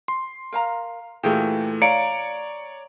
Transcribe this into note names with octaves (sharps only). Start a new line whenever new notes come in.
C6
A#4 F5 A#5
A#2 E3 A3 G4 G#4 A#4
C#5 D5 F5 A#5 C#7 D7